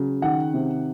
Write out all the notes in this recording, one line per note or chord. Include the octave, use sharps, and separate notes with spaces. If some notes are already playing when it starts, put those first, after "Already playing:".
Already playing: C#3 F#3
D#3 F#5
C3